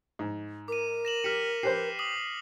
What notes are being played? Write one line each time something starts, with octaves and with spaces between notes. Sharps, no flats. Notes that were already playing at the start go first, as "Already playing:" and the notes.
G#2
A#4 D6 D#7
A#6 E7 F#7
G4 F6 B6 C#7
G4 B4 C5 C7
D6 D#6 F#7